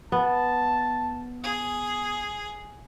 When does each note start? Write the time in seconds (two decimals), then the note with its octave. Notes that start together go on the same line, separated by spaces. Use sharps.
0.12 B3 A5
1.44 G#4 D#6